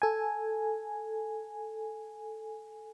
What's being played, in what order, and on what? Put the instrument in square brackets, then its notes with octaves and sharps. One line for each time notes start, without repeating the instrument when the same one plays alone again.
[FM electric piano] A4 G#5